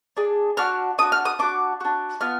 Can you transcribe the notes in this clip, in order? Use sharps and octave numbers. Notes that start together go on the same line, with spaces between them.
D4 G#4
D4 F#4 F6
D4 F#4 D#6
F6
D#6
D4 F#4 D6
D4 F#4
B3 F4 F6